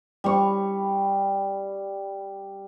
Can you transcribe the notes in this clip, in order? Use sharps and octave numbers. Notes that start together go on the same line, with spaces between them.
G3 C#6